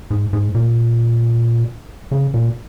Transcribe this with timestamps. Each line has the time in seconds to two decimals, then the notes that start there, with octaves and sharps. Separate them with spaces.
0.10 G#2
0.33 G#2
0.55 A#2
2.11 C#3
2.34 A#2